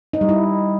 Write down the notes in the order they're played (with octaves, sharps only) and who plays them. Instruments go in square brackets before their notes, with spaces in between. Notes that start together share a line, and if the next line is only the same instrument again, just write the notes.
[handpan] D#4
G3
E4